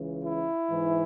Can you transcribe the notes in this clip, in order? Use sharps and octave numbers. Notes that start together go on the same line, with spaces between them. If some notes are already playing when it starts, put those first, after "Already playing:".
Already playing: C#2 C#3 E3
E4
G#2 E3